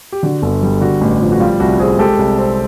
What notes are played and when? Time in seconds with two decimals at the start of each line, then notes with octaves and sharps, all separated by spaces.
0.12 G4
0.23 D3 F#4
0.42 G1
0.63 G3
0.81 D3 F#4
1.01 A1
1.21 F3
1.32 F#4
1.40 G3 F4
1.60 C2 F#4
1.79 C4 F#4 G#4
1.99 G#3 G4 A4
2.19 C2
2.38 C4